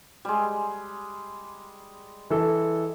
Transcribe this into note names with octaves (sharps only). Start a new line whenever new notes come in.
G3 G#3
E3 A4